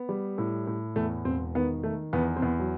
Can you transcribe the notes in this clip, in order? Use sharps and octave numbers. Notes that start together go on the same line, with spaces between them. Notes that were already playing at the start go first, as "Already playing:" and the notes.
Already playing: B3
G3
A2
A2
E2 A3
E1 C4
D#3 B3
D#3 A3
E2 B3
C4
E2 B3
F#3